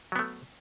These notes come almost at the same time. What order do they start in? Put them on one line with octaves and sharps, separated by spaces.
F#3 B3 A3